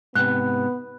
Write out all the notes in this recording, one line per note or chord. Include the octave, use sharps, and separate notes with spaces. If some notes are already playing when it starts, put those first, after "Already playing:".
G#2 C3 B3 F#6